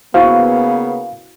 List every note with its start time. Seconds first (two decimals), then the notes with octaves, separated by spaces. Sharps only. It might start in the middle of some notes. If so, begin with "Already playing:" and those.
0.14 C#3 A#3 B3 E4 F#4 C5 F5